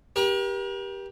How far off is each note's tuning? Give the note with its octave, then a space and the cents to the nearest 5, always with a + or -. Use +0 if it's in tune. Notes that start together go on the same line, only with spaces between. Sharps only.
G4 +0 A#4 +45